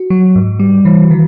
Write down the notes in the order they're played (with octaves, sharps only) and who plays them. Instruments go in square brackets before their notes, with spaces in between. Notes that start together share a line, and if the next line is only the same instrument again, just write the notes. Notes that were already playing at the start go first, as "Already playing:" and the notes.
Already playing: [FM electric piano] F#4
F#3
G#2
G3
E3
D#3